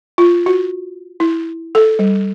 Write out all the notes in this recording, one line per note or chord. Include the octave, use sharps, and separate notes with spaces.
F4
F#4
E4
A4
G3